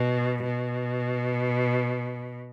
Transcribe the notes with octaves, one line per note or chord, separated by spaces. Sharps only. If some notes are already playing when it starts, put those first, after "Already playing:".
Already playing: B2
B2